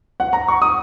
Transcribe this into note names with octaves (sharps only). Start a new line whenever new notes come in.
F#5
A#5
C#6
D#6